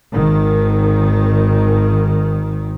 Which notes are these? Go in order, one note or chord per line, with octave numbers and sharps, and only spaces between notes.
G#1 D#3